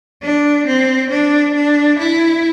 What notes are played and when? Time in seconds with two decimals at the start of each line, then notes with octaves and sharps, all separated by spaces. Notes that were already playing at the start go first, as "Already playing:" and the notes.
0.22 D4
0.67 C4
1.10 D4
1.55 D4
1.99 E4